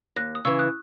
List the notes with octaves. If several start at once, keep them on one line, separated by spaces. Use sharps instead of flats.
D#2 F#6 A#6
D#6
C#3 E3 C#6 E6
D#6 F#6